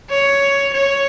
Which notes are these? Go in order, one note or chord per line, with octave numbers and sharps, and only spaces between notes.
C#5
C#5